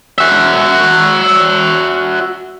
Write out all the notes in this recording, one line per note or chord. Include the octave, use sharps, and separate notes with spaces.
F#4 E5